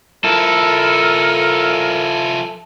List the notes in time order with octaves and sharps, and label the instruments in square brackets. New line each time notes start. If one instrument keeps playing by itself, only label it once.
[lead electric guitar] F3 E4 [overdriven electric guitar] A4 [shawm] A#4